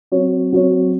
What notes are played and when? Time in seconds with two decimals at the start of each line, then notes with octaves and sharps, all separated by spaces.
0.12 F#3 C4 F#4 C#5
0.52 F#3 C4 F#4 C#5